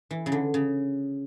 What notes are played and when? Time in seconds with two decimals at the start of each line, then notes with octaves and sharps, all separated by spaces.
0.11 E3
0.26 C#3
0.32 D3
0.54 C#3